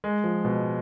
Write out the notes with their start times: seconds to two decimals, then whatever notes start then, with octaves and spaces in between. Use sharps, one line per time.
0.04 G#3
0.24 F3
0.45 B2